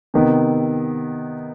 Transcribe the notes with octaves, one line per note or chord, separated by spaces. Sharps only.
C3 D#3 B3